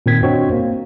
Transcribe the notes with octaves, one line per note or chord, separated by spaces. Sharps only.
A#2 D#3 C4 A#4 G#6 B6
C4 D4 F#4 C5 C#5 D#5
A#3